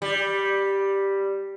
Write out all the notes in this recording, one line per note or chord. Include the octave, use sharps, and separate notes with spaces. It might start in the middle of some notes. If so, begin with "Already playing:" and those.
G3